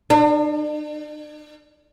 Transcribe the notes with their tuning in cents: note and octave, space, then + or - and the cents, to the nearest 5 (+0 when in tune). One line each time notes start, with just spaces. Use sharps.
D4 +45